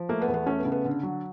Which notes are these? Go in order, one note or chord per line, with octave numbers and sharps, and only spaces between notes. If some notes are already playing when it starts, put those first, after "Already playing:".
Already playing: F3
A3 A#3
B3
E2
B3
A3 C#4
B3
C#3
B3
D3
F#3